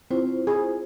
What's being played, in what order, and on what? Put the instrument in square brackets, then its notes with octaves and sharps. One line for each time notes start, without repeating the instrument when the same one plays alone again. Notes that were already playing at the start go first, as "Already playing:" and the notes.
[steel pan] C4 [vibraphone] E4 F4 C5
[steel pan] G#4